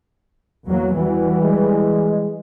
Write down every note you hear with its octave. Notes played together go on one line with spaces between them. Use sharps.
E2 F#3 A#3
E3 G3 F#4
G#3